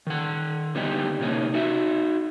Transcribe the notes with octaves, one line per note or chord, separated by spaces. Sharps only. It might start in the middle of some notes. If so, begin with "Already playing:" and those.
D#3 F#5
D3 G3 B3 D#4 G4
C3 A#3 C#4 D#4
D#4 F#4 E5